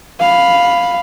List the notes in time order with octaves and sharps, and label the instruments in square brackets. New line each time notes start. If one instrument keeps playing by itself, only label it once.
[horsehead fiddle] F5 B5